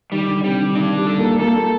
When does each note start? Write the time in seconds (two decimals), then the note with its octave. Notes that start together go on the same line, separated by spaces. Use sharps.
0.12 D#3 G3
0.28 D3
0.43 C3 G3
0.60 D3
0.75 D#3 D4
0.97 G3
1.07 A4
1.18 A#3
1.39 A#3 A4
1.55 A#3